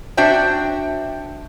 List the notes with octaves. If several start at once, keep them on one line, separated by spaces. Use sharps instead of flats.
D4 F#4 C5 E5 G5